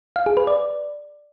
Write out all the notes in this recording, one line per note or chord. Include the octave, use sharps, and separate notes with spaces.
F5
G#4
B4
D5